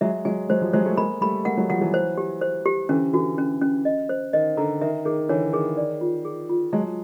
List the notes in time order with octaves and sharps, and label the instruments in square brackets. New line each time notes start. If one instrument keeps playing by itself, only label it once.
[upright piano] F#3 G#3 [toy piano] E5
[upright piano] F#3 G#3 [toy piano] G#5
[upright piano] F#3 G#3 [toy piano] C5
[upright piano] F3 G3
[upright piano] F#3 G#3 [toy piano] C5
[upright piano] G3 A3
[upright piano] G#3 A#3 [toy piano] B5
[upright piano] G3 A3 [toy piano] B5
[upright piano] G#3 A#3 [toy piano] F#5
[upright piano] F#3 G#3
[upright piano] F3 G3 [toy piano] F#5
[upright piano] E3 F#3
[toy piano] C5
G4
C5
G4
[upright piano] D3 E3 [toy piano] C#4
[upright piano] D3 E3 [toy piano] F#4
[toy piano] C#4
C#4
D#5
C5
[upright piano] D#3 [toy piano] D#5
[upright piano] D3 [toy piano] A#5
[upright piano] D#3 [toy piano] E5
[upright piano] D#3 [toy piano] G#4
[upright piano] D3 E3 [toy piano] C#5
[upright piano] D#3 [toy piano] G#4
[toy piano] D5
F4
G#4
F4
[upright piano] F#3 G#3 [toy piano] A5